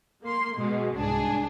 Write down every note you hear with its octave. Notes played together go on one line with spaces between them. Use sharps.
A#3 C6
B2 G#3
C2 G#2 D4 G#4